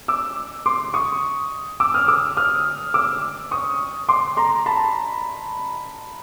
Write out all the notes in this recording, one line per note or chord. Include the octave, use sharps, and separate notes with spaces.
D6 E6
C6 D6
C#6 D#6
D6 E6
D#6 F6
D6 E6
D#6 F6
D6 E6
C#6 D#6
C6 D6
A#5 C6
A5 B5